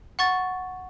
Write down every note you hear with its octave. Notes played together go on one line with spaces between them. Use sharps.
F#5 C#6 A6